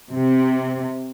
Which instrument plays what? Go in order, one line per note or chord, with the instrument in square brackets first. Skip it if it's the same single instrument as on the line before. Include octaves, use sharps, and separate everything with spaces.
[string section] C3